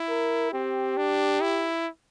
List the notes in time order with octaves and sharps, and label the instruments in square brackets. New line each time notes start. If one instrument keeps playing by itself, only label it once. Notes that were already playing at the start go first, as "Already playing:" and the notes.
Already playing: [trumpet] E4
[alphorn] A#4
[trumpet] C4 [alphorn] G4
[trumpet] D4
E4